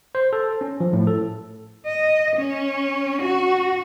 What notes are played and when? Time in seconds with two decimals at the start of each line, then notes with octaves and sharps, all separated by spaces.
0.15 C5
0.33 A4
0.61 C#4
0.80 F3
0.93 A2
1.07 A4
1.86 D#5
2.36 C#4
3.22 F#4